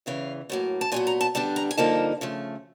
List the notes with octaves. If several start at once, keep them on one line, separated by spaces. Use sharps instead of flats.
E2 C#3 E3 F5
A2 F#3 A#3
A5
A#2 F#3 B3 G#5
A#5
A5
D3 G3 B3 D4 A5
A#5
G#5
G2 D3 F3 A#3 D#4 A5
C#3 F3 A3